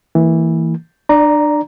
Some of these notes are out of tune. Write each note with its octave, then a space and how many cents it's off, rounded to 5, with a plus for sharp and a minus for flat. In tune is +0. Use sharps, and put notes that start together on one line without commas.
E3 -10 A#3 -35
D4 +30 D5 +0 A#5 +0